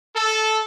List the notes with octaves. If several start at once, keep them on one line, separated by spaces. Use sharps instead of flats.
A4